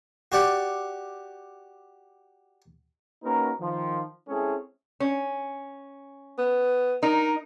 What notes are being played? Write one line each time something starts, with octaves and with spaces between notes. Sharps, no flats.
F#4 G4 D5 F#5
A#3 C#4 D#4 F#4 A#4 B4
D#3 F3
G#3 C4 C#4 E4 G#4 A4
C#4
B3
D#4 A#4